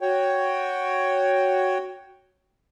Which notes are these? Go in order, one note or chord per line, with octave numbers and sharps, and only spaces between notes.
F#4 C#5 G5